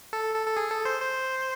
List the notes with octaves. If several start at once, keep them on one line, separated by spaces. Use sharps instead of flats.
A4
A4
A4
G#4
A4
C5
C5